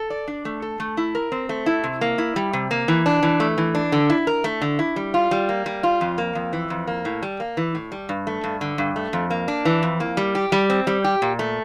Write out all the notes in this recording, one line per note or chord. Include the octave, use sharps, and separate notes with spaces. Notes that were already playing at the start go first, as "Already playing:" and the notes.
Already playing: A4
D5
D4
A3
A4
A3
E4
A#4
C4
A3
E4
C3
A#3
E4
G3
C3
A#3
E3
D4
E3
A3
E3
D4
D3
E4
A#4
A3
D3
E4
G3
F4
G3
A#3
G3
F4
F2
A#3
F2
E3
F2
A#3
A2
G3
A#3
E3
A2
G3
G2
A3
G2
D3
G2
A3
F2
A#3
D4
E3
F2
A#3
G3
G4
G3
C4
G3
G4
A#2
A3